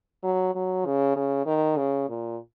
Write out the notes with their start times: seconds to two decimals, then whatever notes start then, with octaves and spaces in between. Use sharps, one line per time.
0.24 F#3
0.55 F#3
0.86 C#3
1.16 C#3
1.46 D#3
1.77 C#3
2.09 A#2